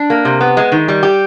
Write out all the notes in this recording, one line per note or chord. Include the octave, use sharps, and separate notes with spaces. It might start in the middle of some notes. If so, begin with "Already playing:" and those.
Already playing: D4
A#3
C3
B3
G#3
D#3
G3
G4